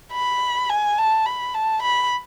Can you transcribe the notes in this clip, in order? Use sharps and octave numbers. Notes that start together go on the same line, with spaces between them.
B5
G#5
A5
B5
A5
B5